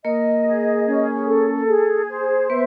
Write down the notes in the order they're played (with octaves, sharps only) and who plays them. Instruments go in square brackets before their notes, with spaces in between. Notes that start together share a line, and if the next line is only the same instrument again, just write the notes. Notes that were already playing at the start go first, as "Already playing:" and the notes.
[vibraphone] A#3 A#4 [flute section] D#5
[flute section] G#4
C#4
A4
G#4
C5
[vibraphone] B3 B4 [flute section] E5